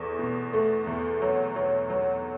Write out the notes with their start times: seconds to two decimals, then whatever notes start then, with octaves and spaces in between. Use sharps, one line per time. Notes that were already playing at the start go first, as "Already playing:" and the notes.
Already playing: E2 A3 C#6
0.19 B2
0.53 A3
0.87 E2
1.22 F#3
1.56 F#3
1.90 F#3